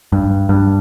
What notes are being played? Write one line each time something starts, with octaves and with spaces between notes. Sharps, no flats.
G2
G2